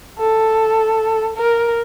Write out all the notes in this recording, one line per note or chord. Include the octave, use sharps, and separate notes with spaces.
A4
A#4